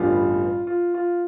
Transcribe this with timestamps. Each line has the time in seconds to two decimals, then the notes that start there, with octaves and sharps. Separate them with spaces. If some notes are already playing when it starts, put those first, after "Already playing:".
Already playing: A1 G2 D3 G3 B3 F4
0.67 F4
0.94 F4